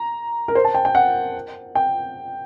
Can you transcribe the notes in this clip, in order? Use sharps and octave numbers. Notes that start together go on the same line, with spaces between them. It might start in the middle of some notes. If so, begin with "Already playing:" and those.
Already playing: A#5
A#4
C5
A5
G5
G5
F#5
G5